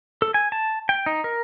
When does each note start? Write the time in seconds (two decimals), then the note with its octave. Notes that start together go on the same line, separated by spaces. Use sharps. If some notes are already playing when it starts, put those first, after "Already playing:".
0.22 A4
0.34 G#5
0.52 A5
0.89 G5
1.06 D#4
1.24 A#4